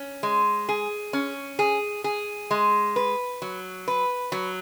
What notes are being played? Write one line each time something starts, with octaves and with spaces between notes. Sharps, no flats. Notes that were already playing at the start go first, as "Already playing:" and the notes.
Already playing: C#4
G#3
G#4
C#4
G#4
G#4
G#3
B4
F#3
B4
F#3